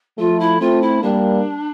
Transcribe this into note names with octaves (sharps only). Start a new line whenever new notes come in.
F3 A3 F4
E4
A3 C4 F4
E4
G3 A#3 D4